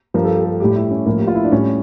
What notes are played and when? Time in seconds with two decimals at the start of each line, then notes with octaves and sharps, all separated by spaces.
0.14 G2 F3 A#4
0.25 A4
0.36 G4
0.45 A4
0.60 A2 G3 G4
0.76 E4
0.91 C#4
1.06 A2 F3 A#3
1.18 G4
1.27 F4
1.35 E4
1.44 D4
1.52 A2 G3 C#4